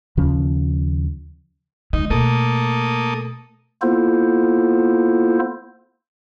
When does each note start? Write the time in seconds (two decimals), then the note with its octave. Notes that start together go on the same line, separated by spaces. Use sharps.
0.17 D#2 C#3 F3 C#4
1.93 D3 G#3 D#4
2.10 B2 A3 A#3 A4 D#6
3.82 A#3 B3 E4 F4 A4 C5